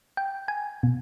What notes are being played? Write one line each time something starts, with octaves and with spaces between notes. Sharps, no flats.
G5
G#5
B2